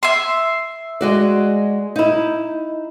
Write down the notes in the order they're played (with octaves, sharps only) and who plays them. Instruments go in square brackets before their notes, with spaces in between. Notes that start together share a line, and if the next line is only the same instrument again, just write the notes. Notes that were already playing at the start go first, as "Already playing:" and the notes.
[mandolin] E5 C6
[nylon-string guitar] G#3 F#4 D5
D#4 E4